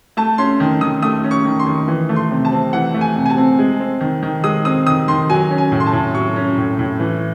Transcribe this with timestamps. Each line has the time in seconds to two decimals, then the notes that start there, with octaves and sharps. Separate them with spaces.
0.17 A3 A5
0.38 C#4 C6
0.60 D#3
0.81 D#3 D#6
1.02 A3 D#6
1.24 C#4
1.31 C#6
1.45 D#3
1.60 C6
1.66 D#3
1.88 E3
2.09 A3
2.16 C6
2.31 C3
2.45 A5
2.52 C4
2.73 E3 F#5
2.94 A3
3.01 G#5
3.16 C3
3.25 G#5
3.30 A5
3.37 C4
3.59 G#3
3.80 C4
4.01 D#3
4.23 D#3
4.44 G#3 D#6
4.65 C4 D#6
4.87 D#3 D#6
5.08 D#3 C6
5.29 F#3 G#5
5.51 C#4
5.58 G#5
5.72 A2
5.80 C6
5.86 A5
5.93 A2
6.14 F#3 C#6
6.36 C#4
6.57 A2
6.79 A2
7.00 E3